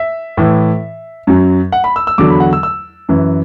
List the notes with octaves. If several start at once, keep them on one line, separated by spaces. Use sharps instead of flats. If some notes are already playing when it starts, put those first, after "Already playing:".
Already playing: E5
A2 E3
F#2 F#3
F#5
B5
E6
E6
E2 D3 F#3 D6
B5
F#5
E6
E6
F#2 E3